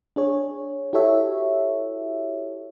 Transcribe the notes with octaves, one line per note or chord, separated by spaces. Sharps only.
D4 G#4 C#5
E4 F#4 G4 A4 C#5 E5